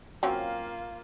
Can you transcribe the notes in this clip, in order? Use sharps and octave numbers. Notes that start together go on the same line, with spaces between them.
F#3 A#3 C4 C#4 F4